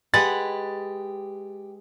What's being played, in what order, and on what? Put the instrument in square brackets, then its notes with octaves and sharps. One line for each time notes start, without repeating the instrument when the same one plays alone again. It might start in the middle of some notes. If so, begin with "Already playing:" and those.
[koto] G#3 B4 F#5 [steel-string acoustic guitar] G4 [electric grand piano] A6